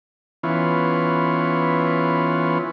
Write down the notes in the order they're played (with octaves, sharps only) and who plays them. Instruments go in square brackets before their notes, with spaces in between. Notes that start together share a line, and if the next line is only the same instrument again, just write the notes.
[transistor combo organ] E3 B3 C#4 F4